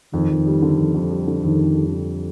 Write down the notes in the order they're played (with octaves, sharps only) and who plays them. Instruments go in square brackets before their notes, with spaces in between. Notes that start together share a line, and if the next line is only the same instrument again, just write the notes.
[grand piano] F2 [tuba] D#3
[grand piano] F2
G3
D3
F2
F2
G3
D3
[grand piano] F2 [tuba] D#3
[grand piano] F2
G3
D3